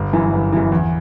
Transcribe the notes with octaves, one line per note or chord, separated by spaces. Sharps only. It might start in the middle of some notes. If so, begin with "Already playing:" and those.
Already playing: G1
F#2 E3
G1
F#2 E3
E2